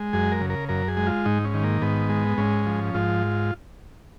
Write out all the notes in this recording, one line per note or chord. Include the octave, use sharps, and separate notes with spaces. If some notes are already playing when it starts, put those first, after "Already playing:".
Already playing: G#3
F#2 G#4
A#4
C#3
A#4
F#2 A#4
G#4
G#3
F4
G#2 D#4
C#4
D#3
A#3
G#2 B3
G#3
G#2 C#4
F3
G#2 F4